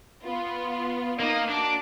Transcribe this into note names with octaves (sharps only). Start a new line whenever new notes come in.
B3 F4
A#3 D#4 A#4 D#6
D4 F#4 D6